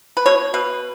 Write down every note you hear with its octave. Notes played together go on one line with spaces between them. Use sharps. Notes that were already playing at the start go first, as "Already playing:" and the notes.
B4
B2 C#5
B2 B4